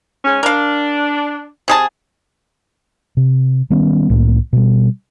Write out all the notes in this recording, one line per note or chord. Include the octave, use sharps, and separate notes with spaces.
G#2 C#4
D4 A#4 F5
C3 G#4 A5
C3
D#3 G3 B3 C#4
C2 A2 G3 A#3
B2 G3